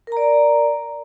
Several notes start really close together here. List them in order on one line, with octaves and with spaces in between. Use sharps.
A#4 A#5 D5